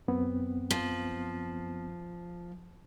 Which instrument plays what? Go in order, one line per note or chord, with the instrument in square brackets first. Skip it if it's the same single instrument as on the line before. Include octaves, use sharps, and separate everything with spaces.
[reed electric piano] F#2 B3 C4
[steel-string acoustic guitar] F3